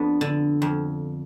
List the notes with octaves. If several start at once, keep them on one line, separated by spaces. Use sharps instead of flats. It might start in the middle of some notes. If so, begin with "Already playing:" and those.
Already playing: F2 B3 D4
D3
F2